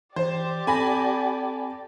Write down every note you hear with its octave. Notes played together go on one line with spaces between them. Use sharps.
E3 G4 C5 D5
C4 A4 G#5 A5 B5 A#6